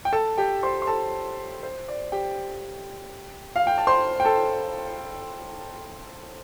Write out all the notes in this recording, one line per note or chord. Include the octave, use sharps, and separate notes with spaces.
G5
A4 A5
G4 G5
C5 C6
C6
A4 A5
C5
D5
G4 G5
F5
G5
A5
C5 C6
G5
A4 A5